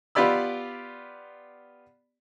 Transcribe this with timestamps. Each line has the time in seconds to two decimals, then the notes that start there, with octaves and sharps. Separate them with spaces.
0.15 B3 F4 G4 D5 B5 E6